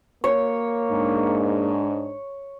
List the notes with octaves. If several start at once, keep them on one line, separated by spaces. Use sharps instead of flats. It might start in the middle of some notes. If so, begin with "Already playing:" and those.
A#3 C#5
G#2 D4